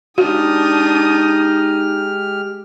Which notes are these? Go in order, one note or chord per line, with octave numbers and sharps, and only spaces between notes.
G#3 D4 D#4 F#4 G4 D#6 F6